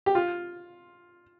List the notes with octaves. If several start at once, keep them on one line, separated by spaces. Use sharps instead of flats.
G4
F4